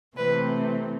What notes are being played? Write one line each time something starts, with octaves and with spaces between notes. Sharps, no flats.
C3 E3 A3 C4 B4